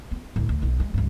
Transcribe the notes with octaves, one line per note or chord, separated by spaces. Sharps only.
B3
D2 A2
D2
B1 B3
G#3
C#2 G2